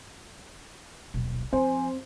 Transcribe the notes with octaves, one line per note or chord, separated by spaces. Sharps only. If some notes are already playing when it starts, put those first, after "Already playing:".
D#1 B1
F3 C4 C5 G#5